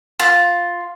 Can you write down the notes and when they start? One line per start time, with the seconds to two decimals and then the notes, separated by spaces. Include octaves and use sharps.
0.20 F4